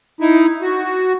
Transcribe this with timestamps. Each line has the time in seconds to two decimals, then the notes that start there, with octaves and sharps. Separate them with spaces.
0.20 D#4 E4
0.62 F#4